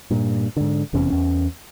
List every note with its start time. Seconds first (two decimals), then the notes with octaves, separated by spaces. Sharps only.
0.11 G2 A#2
0.57 G#2 D3
0.93 F1 E2 C3 C#4
1.10 E2 C#4